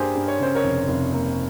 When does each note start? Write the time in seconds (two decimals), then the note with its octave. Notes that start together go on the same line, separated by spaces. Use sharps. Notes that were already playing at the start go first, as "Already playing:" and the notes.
Already playing: G2 A#3 G4 G#4 A#4 C5
0.15 G2
0.28 C#5
0.40 C#3 C5
0.55 A#4 C#5
0.64 F1
0.88 F1
1.13 A#3